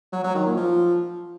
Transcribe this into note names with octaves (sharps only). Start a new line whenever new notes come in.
F#3
F#3
D#3
A#2
F3